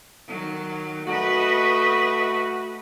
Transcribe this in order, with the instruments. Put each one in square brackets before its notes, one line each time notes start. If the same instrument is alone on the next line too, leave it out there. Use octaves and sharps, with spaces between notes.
[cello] D#3 F#3
[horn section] A3 F#4 [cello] B4 D#5